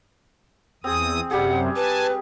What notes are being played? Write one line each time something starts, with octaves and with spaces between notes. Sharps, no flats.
E2 C4 G#4 D#6
F#2 C3 G3 G4 G#4 F#5
B4 G#5 A5